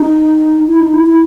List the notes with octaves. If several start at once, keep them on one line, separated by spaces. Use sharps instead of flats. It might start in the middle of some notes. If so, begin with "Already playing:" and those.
Already playing: D#4
E4
D#4
E4
E4